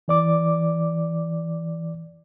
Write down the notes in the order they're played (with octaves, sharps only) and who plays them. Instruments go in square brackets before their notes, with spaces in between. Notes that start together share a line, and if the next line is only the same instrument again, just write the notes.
[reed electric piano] E3 D5 D6